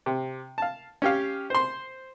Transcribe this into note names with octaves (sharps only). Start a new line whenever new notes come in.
C3
F5 A5
C#4 G4 F5
C5 C6